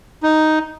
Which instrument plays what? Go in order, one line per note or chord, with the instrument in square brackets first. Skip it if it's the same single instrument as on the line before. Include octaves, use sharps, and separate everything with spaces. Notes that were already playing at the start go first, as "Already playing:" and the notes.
[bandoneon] D#4